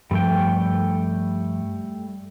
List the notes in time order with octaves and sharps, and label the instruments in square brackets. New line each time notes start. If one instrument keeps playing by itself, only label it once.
[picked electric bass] G2 F3 [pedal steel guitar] G3 A3 G5